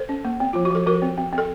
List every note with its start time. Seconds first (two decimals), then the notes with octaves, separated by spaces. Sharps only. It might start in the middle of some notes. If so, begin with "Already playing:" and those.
Already playing: A4 C5
0.09 C#4
0.25 A#3
0.40 C4
0.53 F3 F4
0.65 F#4
0.70 F3 A4
0.86 F3 F#4 A#4
1.02 C4
1.18 C4
1.33 C4
1.38 A4